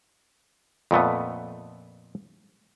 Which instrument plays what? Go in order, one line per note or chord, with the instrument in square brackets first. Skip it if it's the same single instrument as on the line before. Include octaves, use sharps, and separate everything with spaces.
[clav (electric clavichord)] F2 A#2 A3 B3